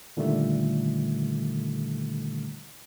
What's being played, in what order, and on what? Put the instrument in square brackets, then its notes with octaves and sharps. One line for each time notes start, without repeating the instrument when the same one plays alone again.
[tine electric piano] A#2 D3 D#3 G3 A3